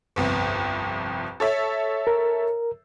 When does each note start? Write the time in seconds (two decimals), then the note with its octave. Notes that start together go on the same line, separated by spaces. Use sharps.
0.16 G1 C2 F2
1.40 A4 C#5 E5
2.07 A#4